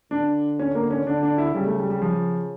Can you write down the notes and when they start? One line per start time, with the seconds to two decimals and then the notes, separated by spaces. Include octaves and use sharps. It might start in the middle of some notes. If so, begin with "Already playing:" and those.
0.11 D3 D4
0.59 C#4
0.75 A#3
0.91 C#4
1.06 D3 D4
1.23 D4
1.38 E4
1.54 C#3 G3
1.66 A3
1.78 G3
1.90 G3
2.02 F3